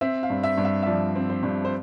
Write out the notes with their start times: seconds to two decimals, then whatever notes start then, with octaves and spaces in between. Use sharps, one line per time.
0.01 C4 E5
0.23 F5
0.30 G2
0.43 E5
0.58 G2
0.65 E5
0.83 E5
0.86 F3 D5
1.15 C4
1.30 C5
1.43 G2
1.65 C5